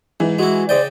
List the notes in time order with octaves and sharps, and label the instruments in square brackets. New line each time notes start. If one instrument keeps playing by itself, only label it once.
[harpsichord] G#2 [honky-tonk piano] E3
[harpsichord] G#3 E4 [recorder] F#4
[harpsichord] C#3 D#5 G5 [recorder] C5 [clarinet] D5